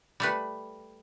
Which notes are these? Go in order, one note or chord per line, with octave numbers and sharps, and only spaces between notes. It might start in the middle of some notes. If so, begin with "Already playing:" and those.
G3 A3 B4